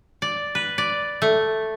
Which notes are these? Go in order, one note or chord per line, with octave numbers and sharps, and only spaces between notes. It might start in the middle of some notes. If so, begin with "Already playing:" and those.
D5
B4
D5
A3